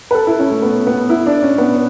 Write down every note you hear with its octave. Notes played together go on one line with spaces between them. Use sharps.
B4
A4
E4
C#4
A3
B3
B3
E4
D4
C#4
B3